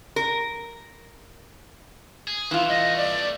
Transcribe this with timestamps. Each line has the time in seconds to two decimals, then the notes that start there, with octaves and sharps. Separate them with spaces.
0.16 A#4
2.28 G#4
2.51 E3 C4 E4 F4
2.69 C2 A3 D#5
2.97 D5